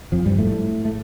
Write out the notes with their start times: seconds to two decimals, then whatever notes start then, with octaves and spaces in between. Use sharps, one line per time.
0.12 F2 F3
0.25 G2 G3
0.38 A2 A3
0.85 A3